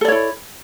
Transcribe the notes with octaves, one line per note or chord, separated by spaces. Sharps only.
E4 A4 C#5 D5